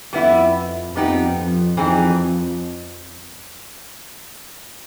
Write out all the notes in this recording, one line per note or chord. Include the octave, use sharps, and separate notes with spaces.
F2 G3 B3 E4
F2 G3 B3 D#4 G4
F2
F2 E3 G3 C4 D#4 G#4